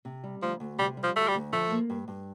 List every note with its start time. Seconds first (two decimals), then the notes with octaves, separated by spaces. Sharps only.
0.05 C3
0.24 G3
0.42 D2 F3
0.60 D2
0.79 C3 G3
0.97 G3
1.03 F3
1.16 D2 A3
1.28 G3
1.34 D2
1.53 F3 A3
1.72 A#3
1.90 G2
2.08 G2